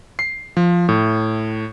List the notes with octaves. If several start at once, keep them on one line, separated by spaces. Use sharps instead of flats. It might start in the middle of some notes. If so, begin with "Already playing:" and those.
C7
F3
A2